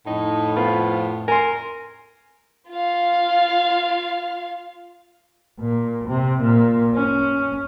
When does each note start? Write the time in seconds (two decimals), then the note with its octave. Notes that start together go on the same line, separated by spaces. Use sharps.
0.07 F2 A2 D#4
0.56 F3 B3 F4
1.28 A#4 G#5 C6
2.71 F4 F5
5.59 A#2
6.08 C3
6.41 A#2
6.95 C#4